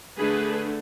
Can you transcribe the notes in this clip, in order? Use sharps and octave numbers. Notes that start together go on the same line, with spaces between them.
D3 A3 D4 G#4 B4